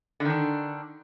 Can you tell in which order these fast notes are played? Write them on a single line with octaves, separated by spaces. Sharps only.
D3 D#3 D4